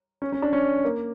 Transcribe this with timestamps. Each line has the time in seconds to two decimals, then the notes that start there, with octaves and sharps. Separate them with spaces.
0.22 C#4
0.32 C#4
0.42 D4
0.53 C#4
0.85 A#3